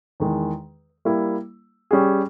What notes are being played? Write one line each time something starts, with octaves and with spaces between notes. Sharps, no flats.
E2 D#3 G#3
G3 A#3 E4
G3 C#4 G#4